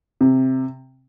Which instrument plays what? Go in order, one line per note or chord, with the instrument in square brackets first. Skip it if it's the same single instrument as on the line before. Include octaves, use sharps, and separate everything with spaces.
[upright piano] C3